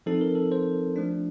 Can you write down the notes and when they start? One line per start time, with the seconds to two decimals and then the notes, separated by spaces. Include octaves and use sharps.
0.06 F3 C4 D#4 A4
0.21 A#4
0.35 A4
0.52 C5
0.96 F3 A3 D4